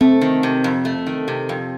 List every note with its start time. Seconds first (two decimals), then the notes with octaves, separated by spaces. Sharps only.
0.01 A3 C4
0.21 D#3
0.43 C3
0.64 F2
0.85 A3
1.06 D#3
1.28 C3
1.49 F2